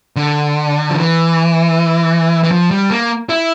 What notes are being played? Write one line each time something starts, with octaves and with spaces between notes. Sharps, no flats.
D3
F3
E3
E3
F3
G3
A#3
E4